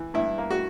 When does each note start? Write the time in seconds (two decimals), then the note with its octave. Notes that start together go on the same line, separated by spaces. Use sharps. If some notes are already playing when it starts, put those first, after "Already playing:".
Already playing: E3
0.14 G2 E4
0.38 A#3
0.50 F#4